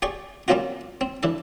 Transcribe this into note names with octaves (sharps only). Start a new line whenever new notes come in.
G4 G#4 D5 C#6
G3 A#3 C4 C#4 F4 F#4
C4
E3 D4 A4